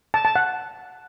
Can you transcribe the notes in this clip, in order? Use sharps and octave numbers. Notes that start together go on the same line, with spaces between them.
A5
A5
F#5